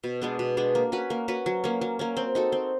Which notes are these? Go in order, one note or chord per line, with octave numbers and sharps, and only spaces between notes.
B2
G#3 B3 D4
B2
G#3 B3 D4
A#3
C#4 F#4 B4
A#3
C#4 F#4 B4
F#3
A#3 C#4
F#3
A#3 C#4
C4
D#4 F#4 A4
C4